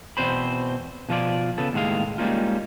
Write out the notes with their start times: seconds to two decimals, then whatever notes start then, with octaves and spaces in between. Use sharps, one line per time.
0.17 E2 G#2 B2 C4 C5 B5
1.09 B2 F3 F4 D5
1.58 C#3 B3 A4
1.73 D#2 A2 G#3 F5
2.18 G3 G#3 A#3 C#4 D#4 F4